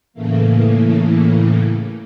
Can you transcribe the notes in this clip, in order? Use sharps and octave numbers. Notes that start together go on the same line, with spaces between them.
A2 C#3 E3 A3 A#3